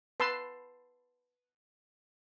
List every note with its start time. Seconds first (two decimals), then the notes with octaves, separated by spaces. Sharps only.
0.20 B4 A5 C6 E6